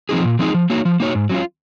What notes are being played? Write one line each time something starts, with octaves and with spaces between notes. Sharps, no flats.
F3 C4 D#4 G#4
A#2
F3 C4 D#4 G#4
F3
A#3 D#4 F#4 C#5
F3
A#3 D#4 F#4 C#5
G#2
F#3 C#4 F4